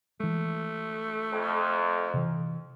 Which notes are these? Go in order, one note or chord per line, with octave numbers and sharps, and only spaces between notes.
E3 G#3 A3
F2
C3 E3